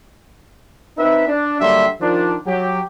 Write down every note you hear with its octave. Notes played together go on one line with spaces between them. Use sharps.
C4 D#4 B4 E5
D4
D3 F#3 G3 A#3 E5 C6
D#3 F3 D4
F#3 G4